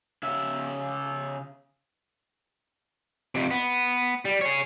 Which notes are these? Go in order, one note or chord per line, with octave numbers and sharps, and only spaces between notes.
C#3 E5
F2 C3
B3
G3
G#4 C#5